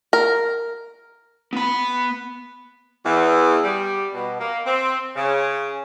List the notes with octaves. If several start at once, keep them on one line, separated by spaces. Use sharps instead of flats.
A#4
B3 B5
E2
G3
B2
A#3
C4
C#3